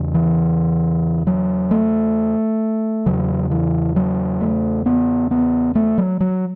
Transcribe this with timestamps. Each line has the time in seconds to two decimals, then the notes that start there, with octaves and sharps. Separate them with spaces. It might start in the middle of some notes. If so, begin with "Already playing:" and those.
Already playing: E2 C#3
0.14 E3
1.27 F#3
1.71 A3
3.06 E2 C#3 F#3
3.51 E3
3.96 F#3
4.41 A3
4.86 B3
5.31 B3
5.75 A3
5.98 F#3
6.21 F#3